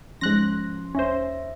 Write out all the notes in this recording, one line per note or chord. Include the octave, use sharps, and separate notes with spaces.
G#2 F3 C#4 C6 F#6 A#6
D#2 C#4 C5 E5 A#6